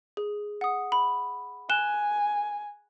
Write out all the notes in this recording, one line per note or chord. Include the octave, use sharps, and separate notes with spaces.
G#4
F#5 D#6
B5
G#5 F#6 E7 G7